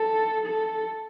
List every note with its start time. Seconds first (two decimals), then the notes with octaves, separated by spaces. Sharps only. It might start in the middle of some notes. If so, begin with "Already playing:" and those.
Already playing: A4
0.47 A4